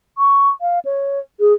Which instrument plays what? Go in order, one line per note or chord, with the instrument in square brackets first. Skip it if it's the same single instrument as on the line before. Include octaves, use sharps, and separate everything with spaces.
[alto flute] C#6
F5
C#5
G#4